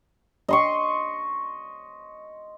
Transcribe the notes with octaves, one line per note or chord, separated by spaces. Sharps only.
D#5 C6 C#6